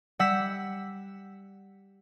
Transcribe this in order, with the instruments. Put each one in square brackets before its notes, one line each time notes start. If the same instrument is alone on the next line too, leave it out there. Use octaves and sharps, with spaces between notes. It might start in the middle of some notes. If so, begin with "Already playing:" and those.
[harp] G3 F#5 E6 B6